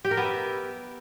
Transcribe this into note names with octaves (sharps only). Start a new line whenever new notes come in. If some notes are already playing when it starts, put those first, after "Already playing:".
G4
A#4
B3
E5